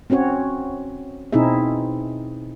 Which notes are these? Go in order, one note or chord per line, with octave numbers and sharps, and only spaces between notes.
C4 C#4 F#4 C#5
B2 C4 D#4 E4 G#4 E5